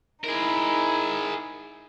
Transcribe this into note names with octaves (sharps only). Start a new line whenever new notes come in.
D#4 E4 G#4 A#4